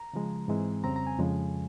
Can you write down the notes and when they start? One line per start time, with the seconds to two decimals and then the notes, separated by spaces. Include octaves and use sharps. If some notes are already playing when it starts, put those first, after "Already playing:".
Already playing: A#5
0.14 C#3 F3 G#3
0.48 G#2 E3 G#3 C4
0.84 F2 C#3 G3 C4 A#5
0.96 A#5
1.07 G#5
1.18 F2 C#3 F3 G#3